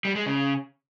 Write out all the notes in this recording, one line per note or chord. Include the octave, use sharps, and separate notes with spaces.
G3
G#3
C#3